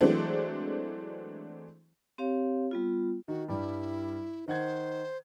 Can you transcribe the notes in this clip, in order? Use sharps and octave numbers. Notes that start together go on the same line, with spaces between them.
E3 F#3 G#3 A3 C4 D4
C4 G4 C#5 F5
G3 B3 F4
D#3 F#4
G2 G3 E4
D#3 C5 F#5 G#6